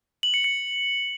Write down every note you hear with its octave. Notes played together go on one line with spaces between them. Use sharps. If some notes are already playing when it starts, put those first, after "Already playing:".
F#7
C#7
C#7